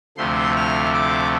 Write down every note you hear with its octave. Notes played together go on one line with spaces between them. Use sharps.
D2 C3 F3 A3 C6
F6
D6